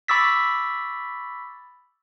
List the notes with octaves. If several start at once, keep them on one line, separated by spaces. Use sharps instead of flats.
B5 C#6 D6 E6 A6 B6